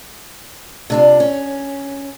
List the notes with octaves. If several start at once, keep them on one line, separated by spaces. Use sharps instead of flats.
C3 D4 F4
C#4